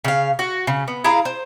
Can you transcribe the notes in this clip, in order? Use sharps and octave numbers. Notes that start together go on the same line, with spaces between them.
C#3 F5
F#4
C#3
B3
E4 G#4 F5 A#5
C5